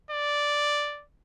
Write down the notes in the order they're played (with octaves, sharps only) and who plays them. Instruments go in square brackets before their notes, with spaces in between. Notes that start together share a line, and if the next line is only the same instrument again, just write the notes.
[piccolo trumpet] D5